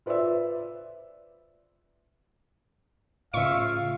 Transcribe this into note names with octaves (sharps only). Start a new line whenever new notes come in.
F4 B4 C5 D5 E5
A2 C#3 F4 E5 F5 C#6 C#7